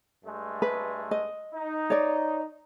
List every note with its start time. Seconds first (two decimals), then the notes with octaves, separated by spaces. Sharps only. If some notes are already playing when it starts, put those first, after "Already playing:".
0.24 G2 G#3 A3
0.62 B4
1.11 D#5
1.53 D#4
1.90 C#5 D5